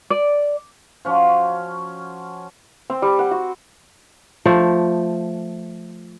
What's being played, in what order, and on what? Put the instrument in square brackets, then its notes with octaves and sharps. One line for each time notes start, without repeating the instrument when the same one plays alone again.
[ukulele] D5
[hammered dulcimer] F3 C#4 F#4
[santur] C4
G3
F#5
F#4
[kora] F3 A3